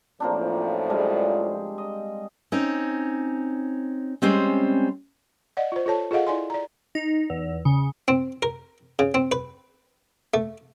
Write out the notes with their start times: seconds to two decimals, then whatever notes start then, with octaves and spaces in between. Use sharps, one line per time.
0.20 F#2 A2 F3 A#3 C4 D4
0.90 G3 G#3 D4
1.78 D#5
2.52 C4 C#4 D#4
4.22 G3 G#3 C4 C#4 C5
5.57 D5 D#5 F#5
5.72 F4 C5
5.86 F4 A4 C#5 A5
6.11 F4 G#4 A4 D#5 F5 F#5
6.27 E4 D5 G#5 C6
6.50 D5 A#5
6.95 D#4
7.30 E2
7.65 C#3
8.08 C4
8.42 A#4
8.99 C#3
9.14 C4
9.32 B4
10.34 A3